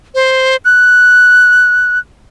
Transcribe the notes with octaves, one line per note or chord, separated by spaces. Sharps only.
C5
F#6